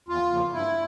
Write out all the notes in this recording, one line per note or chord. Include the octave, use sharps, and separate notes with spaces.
E2 F4
C#3 F3 A#3
G2 E4